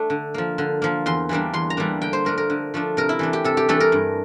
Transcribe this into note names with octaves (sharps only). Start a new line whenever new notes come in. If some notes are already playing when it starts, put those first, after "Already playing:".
Already playing: A3 D4
D3
F3 A#3
D3
F3 A#3
E2 C6
E3 G3 A#3 D4
E2 C6
A#5
E3 G3 A#3 D4
D3 G5
C5
F3 A3 D4 A#4
A#4
D3
F3 A3 D4
C3 A#4
E4
E3 A3 D4
G4
C3 A4
G4
E3 A3 D4 A4
A#4
G2